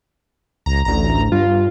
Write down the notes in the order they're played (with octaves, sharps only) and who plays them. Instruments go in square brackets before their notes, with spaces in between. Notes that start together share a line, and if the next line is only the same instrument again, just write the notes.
[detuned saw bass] C#2 [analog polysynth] A#5
[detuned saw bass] A1 [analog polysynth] D2 A#5
[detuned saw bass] G2 [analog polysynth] F4